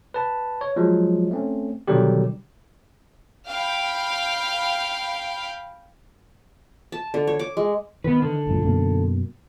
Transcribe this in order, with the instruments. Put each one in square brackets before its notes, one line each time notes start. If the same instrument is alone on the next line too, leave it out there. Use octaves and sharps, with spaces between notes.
[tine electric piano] B4 A5
C#5
F3 F#3 G#3
A3 C4 C#4
B2 D3 D#3 F#3 G3 G4
[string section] F5 G5 B5
[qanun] A5
D3
C#5
D6
G#3
[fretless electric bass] D#3 [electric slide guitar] B3 B4
[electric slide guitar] D3
[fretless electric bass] C#2 F#2 A#2
F#2 B2 A#3